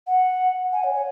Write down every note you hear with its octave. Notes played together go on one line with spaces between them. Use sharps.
F#5
G#5
C#5
C#5